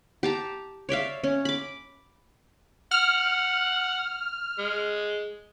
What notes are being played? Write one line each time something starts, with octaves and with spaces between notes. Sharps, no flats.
G4 A5 A#5
C#5 D5 E5 F5
C#4
B5 D6
F#5 F6
G#3